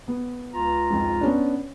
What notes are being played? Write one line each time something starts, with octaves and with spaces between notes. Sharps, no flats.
B3
C#2 F4 A#5
F2 G#2
B3 C#4 D4